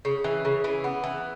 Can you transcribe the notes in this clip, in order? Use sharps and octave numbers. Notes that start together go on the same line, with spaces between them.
C#3
E3
C#3
E3
B3
E3